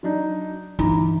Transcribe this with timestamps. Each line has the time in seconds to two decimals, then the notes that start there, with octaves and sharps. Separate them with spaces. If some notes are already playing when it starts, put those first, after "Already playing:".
0.03 F#3 D4 D#4
0.79 G1 E3 D#4 A#5